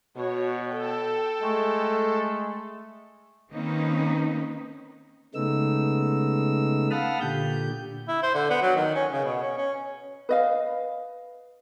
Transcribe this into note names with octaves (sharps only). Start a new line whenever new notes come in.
B2 F#4 C#5
A4 G5
G#3 A3
D#3 A#3 C4 C#4 D#4 B4
C#3 G#3 A3 B3 D#4 E6
F5 F#5 A5 B5 D#6 F6
A#2 D3 G4 G6
E4
C5
D3
B3
F#3
D#3
C#4
C#3
B2
C#4
C#4
B4 D#5 F5